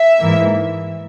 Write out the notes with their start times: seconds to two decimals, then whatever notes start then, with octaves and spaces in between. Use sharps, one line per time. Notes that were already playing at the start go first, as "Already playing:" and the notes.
Already playing: E5
0.20 G#2 E3 A#3